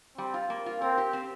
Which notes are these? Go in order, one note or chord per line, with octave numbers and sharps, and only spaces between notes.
G3 C4
F4
A#3
F4
C4 A#4
G4
C4